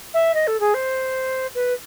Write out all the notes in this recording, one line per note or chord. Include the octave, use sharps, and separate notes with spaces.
E5
D#5
A4
G#4
C5
B4